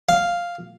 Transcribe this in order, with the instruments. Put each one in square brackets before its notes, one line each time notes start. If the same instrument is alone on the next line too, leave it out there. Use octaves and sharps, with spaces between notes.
[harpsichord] F5